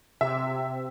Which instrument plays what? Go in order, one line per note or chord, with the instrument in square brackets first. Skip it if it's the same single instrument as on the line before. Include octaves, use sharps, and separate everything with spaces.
[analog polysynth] C3 [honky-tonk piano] E5